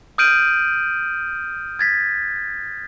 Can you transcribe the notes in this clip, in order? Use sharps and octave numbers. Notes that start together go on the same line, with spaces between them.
D#6 F6 G6 D7 D#7 F#7
G#6 A6 B6